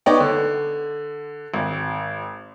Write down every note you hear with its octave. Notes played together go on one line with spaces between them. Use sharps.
B3 D#4 C#5 D5 G5
D3
G#1